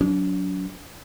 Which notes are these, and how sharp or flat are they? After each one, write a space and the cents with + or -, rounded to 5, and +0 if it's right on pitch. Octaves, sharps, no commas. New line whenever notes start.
F#3 +0 D4 -45